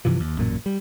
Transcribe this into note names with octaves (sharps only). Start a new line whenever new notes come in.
G2 C3 E3 F3
D#2
A1 F#2 A#2
G3